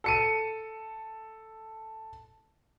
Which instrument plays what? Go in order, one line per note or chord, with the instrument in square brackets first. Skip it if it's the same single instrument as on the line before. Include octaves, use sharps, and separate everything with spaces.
[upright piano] A4 C#7 D#7